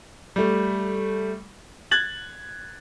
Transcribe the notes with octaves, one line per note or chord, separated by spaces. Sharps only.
G3 A3
F#6 G#6 A6 F#7